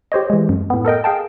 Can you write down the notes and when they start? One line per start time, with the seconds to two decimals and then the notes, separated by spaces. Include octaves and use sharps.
0.12 G4 C5 C#5 D#5
0.30 E3 G#3
0.49 F#2
0.70 A2 B3
0.85 A4 A#4 D#5 G5
1.04 G#4 F5 G5 A5